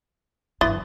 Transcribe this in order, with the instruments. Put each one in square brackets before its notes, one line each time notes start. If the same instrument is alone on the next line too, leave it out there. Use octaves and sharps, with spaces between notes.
[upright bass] G1 F#3 [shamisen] E3 [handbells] C6 D#6 A6